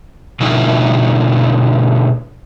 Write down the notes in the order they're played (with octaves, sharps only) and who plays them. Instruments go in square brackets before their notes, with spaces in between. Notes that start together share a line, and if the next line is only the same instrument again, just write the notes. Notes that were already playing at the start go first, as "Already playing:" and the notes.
[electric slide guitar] B2 D3 F3 A3 D#4 E4